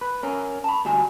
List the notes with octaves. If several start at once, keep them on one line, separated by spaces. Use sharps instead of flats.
B4
C#4 A#4
A5 B5
D2 G3 F#4 G#5